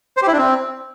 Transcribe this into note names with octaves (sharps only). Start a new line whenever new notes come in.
C5
G4
E4
D4
C4